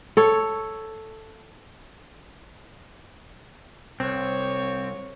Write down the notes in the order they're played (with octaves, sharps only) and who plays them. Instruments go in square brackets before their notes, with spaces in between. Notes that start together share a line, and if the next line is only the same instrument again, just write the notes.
[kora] A4 C#5
[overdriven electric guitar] C2 [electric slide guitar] C4 [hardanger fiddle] C#5